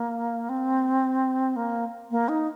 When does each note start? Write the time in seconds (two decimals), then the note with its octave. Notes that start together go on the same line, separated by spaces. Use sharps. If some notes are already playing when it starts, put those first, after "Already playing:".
Already playing: A#3
0.49 C4
1.56 A#3
2.11 A#3
2.29 D#4